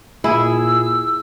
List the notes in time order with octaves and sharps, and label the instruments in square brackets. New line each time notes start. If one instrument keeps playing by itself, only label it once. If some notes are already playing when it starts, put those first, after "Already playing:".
[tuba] A#2 [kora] E4 [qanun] G#4 [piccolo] E6